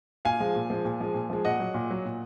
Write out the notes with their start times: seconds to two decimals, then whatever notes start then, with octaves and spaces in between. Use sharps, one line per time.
0.25 A#2 F5 G#5
0.40 F3 G#3
0.55 A#2
0.70 F3 G#3
0.85 A#2
1.00 F3 G#3
1.14 A#2
1.30 F3 G#3
1.45 A#2 D#5 F#5
1.60 F#3
1.74 A#2
1.91 F#3
2.05 A#2